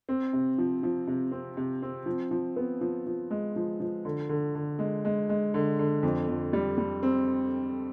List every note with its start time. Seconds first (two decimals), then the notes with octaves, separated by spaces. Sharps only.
0.09 C4
0.33 C3
0.58 F3
0.83 F3
1.07 C3
1.32 C4
1.57 C3
1.82 C4
2.06 F3
2.31 F3
2.56 B3
2.81 F3
3.06 F3
3.31 G#3
3.56 F3
3.80 F3
4.05 D3
4.29 D3
4.55 D3
4.79 G#3
5.05 G#3
5.29 G#3
5.54 D3
5.79 D3
6.03 F2
6.28 F2
6.53 G3
6.78 G3
7.03 C4